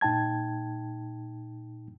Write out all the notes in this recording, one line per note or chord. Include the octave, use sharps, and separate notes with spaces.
A#2 D#4 G5 A5 G#6